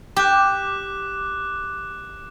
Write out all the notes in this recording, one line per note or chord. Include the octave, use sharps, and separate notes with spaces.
G4 D6 F#6